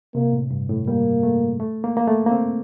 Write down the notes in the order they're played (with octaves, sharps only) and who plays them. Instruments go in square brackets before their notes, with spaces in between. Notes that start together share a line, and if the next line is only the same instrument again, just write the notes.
[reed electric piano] C3 [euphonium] A#3
[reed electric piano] A2
G2
A2
[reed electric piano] G3 [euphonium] A#3
[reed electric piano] A3
A3
A#3
A#3
A3
A#3
C4